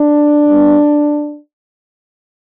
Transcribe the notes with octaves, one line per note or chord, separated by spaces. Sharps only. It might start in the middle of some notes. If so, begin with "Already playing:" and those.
Already playing: D4
G2 G3 B3